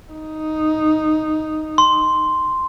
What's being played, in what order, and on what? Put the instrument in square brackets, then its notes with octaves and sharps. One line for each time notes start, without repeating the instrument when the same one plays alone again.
[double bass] D#4
[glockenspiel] C6